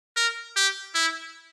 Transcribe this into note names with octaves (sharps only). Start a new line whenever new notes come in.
A#4
G4
E4